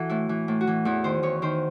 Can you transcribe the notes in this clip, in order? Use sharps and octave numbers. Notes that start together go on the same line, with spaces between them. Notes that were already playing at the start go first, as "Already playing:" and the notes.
Already playing: E3 F#4 A4
A2 E4
E3
A2
F#4
E3
E2 E4
D#3 C5
E2 C#5
D#3 C5